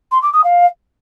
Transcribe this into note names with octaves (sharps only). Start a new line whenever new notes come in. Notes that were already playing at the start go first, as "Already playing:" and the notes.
C6
D6
D#6
F5